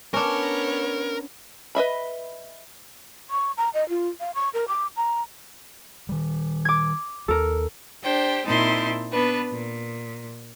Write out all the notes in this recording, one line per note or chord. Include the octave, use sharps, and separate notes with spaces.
B3 C#4 D4 A#4 C#5
B4 D#5 E5 B5
C#6
A#5
D#5
F4
F5
C#6
A#4
D6
A#5
D#3 G3
D6 G#6
D#2 A4 A#4
D4 G4 C5 G5
A#2 C4 D#4 E4 A5 C6
B3 D4 B4
A#2